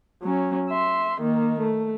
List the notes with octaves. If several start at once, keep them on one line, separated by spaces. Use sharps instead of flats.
F#3 C#4
E5 C6
D#3 A#3
A3